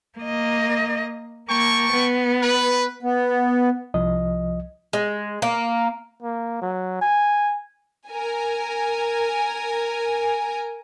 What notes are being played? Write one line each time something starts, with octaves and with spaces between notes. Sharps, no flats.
A#3 D#5
A#3 G5 A5 C#6
B3
B4
B3
C2 F3 D#5
G#3
A#3
A#3
F#3
G#5
A#4 G#5